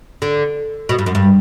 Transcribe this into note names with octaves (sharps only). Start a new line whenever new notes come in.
D3
B2
G2
F#2
G2